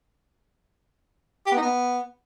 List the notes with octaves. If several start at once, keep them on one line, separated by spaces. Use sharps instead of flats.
G4
B3
D#4
B3